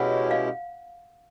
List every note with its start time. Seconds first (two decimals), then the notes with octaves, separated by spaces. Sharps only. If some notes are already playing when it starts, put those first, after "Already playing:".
Already playing: B2 G#3 C#4 E4 G4 F#5
0.31 F5